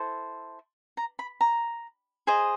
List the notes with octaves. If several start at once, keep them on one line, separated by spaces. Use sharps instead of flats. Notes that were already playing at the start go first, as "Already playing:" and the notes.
Already playing: E4 A4 C5
A#5
B5
A#5
G#4 C5 D#5